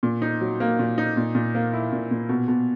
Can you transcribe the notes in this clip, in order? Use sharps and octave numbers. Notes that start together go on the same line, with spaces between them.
A#2
D#4
F#3
A#3
A#2
D#4
A#2
A#2
A#3
E4
A#2
A#2
B2
B2